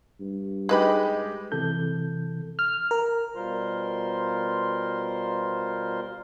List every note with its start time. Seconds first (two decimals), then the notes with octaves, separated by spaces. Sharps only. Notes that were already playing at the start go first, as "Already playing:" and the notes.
0.20 G2
0.69 G#3 D#4 G4 G#4 B4 B5
1.52 C3 E3 A4 G6
2.59 F6
2.91 A#4
3.36 B2 G3 F4 A#4 C5 C6